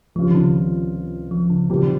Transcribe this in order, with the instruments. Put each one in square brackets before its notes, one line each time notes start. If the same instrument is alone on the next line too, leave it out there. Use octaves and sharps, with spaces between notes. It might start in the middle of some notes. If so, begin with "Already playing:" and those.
[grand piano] C#2 C3 G3 C#4 F4 [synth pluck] F3
[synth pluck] D#3
C#3
F3
C#3
[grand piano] A#2 G3 C4 G4 [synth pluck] C#3
[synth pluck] D#3